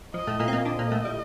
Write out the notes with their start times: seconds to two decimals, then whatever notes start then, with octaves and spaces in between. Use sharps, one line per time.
0.14 F3 D#5
0.27 A2 A3
0.40 A#2 A#3
0.48 C4
0.53 A#2 A#3
0.65 D3 D4 D#5
0.79 A#2 A#3
0.92 A2 A3
1.05 G3